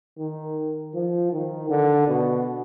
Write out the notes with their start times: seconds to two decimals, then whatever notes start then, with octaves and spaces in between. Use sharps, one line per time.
0.19 D#3
0.94 F3
1.32 D#3
1.70 D3
2.08 B2